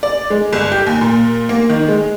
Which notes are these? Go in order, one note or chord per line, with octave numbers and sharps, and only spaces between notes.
D5
G#3
G1
G4
D#2
A#2
A#3
D#3
G#3